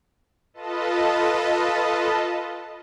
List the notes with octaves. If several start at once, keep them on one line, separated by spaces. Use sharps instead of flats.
F4 A4 B4 D#5 A5